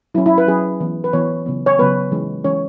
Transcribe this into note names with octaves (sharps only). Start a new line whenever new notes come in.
F#3 C#4 E4
E4
B4
F#3 C#4 G#4
E3 B3
B4
E3 B3 C#5
C#3 F#3 B3
C#5
C#3 F#3 B3 B4
E3 G#3 C#4
E3 G#3 C#4 C#5